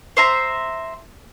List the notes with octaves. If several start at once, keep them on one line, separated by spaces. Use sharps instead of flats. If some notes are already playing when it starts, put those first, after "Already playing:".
C5 E5 A#5